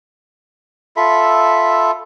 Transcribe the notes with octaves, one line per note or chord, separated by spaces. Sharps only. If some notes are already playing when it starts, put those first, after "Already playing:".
F4 A4 E5 B5